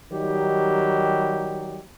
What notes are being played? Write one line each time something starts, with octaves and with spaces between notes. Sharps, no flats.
D#3 F#3 G3 D#4 G4